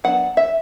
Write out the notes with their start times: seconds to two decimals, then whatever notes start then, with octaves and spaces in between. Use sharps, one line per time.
0.04 F#3 B3 D4 F#5
0.37 E5